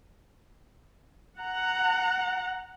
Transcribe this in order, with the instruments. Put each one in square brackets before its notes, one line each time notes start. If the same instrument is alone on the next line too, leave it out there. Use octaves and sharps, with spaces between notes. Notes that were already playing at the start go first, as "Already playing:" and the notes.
[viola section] F#5 A#5